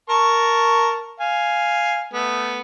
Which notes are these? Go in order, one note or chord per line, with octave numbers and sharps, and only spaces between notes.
A#4 A5 C#6
F5 G#5
A3 B3